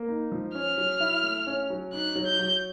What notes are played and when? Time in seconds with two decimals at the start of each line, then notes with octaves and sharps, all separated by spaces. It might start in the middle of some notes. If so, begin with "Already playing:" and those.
Already playing: A#3
0.09 D#4
0.32 F3
0.55 C#4 F6
0.78 F#3
1.00 E4
1.24 A3
1.47 C#4
1.70 F#3
1.93 D#4 F#6
2.16 F#3
2.27 G6
2.39 F#3